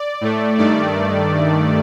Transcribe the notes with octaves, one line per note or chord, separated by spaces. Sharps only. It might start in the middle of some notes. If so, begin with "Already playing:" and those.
Already playing: D5
A2 A3
G2 D#3 A3 D5